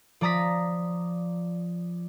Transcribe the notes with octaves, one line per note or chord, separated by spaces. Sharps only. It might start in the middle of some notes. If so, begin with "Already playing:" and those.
F3 D5 A#5 D#6 B6